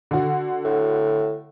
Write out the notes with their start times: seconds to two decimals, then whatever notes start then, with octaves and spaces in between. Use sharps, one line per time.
0.11 D3 F#4
0.64 A2